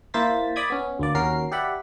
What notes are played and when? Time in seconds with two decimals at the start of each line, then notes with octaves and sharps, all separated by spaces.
0.14 A#3 E4 C5 A6 B6
0.56 D5 B5 D#6 G#6
0.70 B3 C#4
0.99 D2 A#3 D5
1.15 D#2 C#4 F#4 A#4 C7
1.52 G4 D5 E5 F#5 B5